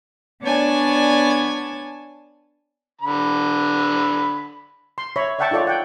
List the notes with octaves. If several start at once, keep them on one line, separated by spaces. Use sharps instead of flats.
B3 D4 C#5 D5 G#5 A5
D3 B5
C6
C#5 E5 B5
D5 E5 F#5 G5 A5 C#6
D#4 F4 A4 C#5 D5
F#5 G5